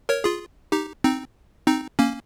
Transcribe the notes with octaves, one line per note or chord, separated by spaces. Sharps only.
A#4 C#5
F4 G#4
D#4 G4
C4 D#4
C4 D#4
A#3 C#4